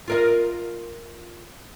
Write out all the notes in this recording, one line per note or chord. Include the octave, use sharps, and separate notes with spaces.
F4 A#4 D#5